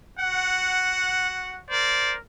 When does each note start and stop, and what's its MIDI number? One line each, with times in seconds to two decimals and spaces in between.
0.20 1.61 66
0.20 1.61 78
1.70 2.16 70
1.70 2.16 72
1.70 2.16 74